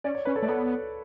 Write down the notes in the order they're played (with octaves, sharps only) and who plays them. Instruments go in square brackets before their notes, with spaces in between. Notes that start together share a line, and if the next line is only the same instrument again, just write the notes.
[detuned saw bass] C#4 [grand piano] D5
[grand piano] C#5
[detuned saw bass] C#4 [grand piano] B4
[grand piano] A4 C#5
[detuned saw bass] A3 [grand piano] D5
[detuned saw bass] B3 [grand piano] A4 C#5